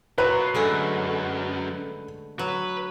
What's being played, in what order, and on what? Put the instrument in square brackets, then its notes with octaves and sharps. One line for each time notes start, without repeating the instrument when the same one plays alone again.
[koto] F#3 [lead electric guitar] F4 A#4 [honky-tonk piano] B4
[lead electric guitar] F#2 [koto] D3 G#3 A3
[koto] F#3 [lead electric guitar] B4